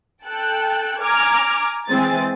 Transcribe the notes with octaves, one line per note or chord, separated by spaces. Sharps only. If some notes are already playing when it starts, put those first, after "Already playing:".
A4 G5 A5 F#6
G#5 A#5 D6 F6 G#6
E3 G#3 C4 G#5 A6